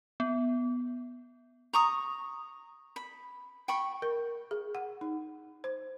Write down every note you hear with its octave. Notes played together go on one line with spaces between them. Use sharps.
B3
A#5 C#6 D#6
B5
G5 B5 C#6
A#4
G#4
F#5
D#4
C5